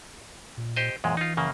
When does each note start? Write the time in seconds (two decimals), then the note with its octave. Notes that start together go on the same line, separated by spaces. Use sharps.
0.57 A#2
0.76 G4 C5 D#5
1.04 F#2 A#2 E3 G#3
1.17 D#4 F4
1.37 F#2 C#3 A#3